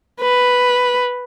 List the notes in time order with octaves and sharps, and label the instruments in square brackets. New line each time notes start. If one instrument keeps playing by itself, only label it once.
[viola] B4